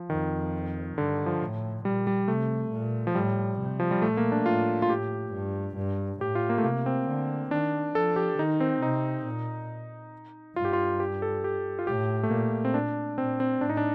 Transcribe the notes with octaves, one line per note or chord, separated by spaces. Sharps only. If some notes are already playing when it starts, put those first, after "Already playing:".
Already playing: F3
F2 D#3
G2 D3
F3
A2
A#2 G3
G3
C3 A3
A#2
F3
A2 G3
C3
F3
G3
A#2 A3
A#3
D4
A2 F4
F4
A2 G4
G2
G2
A2 G4
F4
A#3
A3
C3 A#3
C4
D3
D#3 D4
F3 A4
G4
D#3 D#4
C4
C3 D#4
A#2
G2 F4
G4
F4
G4
A4
G4
F4
A2 G4
A3
A#2 A#3
C4
D4
A#2 C4
C4
A2 D4
D#4
D4